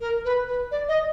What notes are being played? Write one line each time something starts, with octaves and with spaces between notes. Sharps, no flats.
A#4
B4
B4
D5
D#5